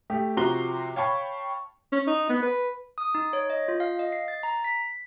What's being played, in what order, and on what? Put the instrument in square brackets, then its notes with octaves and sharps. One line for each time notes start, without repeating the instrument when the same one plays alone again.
[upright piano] A3 G4
C3 F3 F#4 A#5 C6 G7
C#5 F5 G5 A5 B5 C#6
[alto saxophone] C#4
D#4
B3
B4
[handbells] D#6
D#4
C#5
D#5
F4
F5
D#5
C7
A6
A#5
B6